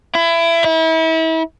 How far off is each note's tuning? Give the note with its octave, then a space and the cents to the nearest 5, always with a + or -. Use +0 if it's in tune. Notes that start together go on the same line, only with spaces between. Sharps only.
E4 +25
E4 -35